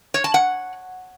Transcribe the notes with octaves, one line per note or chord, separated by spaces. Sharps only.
C#5
A5
F#5